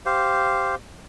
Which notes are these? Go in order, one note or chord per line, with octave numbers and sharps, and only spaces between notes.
G4 C5 F5